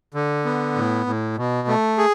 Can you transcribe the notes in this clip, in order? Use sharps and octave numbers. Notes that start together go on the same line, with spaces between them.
D3
B3
A2
A2
B2
A3
G#4